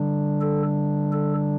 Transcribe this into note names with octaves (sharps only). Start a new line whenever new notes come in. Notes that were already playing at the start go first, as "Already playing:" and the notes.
Already playing: D3 G3 D4
A4
A4